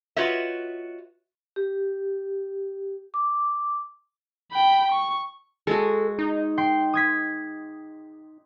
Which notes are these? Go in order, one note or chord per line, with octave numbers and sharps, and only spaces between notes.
F4 F#4 B4 C#5 D#5 E5
G4
D6
G5 B5
C#6
G#3 F#4 A4
D#4
G5 C6 C7
D#6 G#6 B6